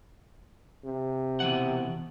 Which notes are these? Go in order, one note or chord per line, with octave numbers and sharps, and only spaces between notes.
C3
B2 E3 F#5